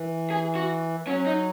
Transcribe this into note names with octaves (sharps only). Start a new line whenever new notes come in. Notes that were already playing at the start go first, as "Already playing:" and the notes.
Already playing: E3
G#4
F#4
F#3 C#4
D#4